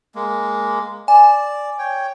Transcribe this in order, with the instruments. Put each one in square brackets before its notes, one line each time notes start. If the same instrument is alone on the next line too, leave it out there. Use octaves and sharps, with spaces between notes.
[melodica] G#3 A#3
[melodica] D5 [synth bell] G#5
[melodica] C#5 G5